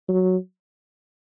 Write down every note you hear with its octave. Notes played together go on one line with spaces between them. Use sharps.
F#3